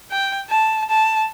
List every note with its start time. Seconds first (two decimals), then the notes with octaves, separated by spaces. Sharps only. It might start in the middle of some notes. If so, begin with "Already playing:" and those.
0.11 G5
0.50 A5
0.90 A5